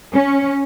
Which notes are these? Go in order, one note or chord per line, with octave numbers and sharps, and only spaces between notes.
C#4